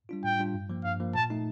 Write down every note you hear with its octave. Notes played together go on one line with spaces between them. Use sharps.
G3 D4 F4
A2 G5
G3 D4 F4
G2
F3 A#3
G2 F5
F3 A#3
A#2 A5
A3 D#4